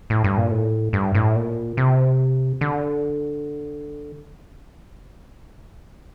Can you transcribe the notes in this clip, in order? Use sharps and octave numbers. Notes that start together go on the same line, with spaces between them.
A2
G2
A#2
A2
G2
A2
A#2
C3
D3